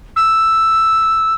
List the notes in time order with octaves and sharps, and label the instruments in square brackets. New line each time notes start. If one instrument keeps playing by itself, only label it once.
[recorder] E6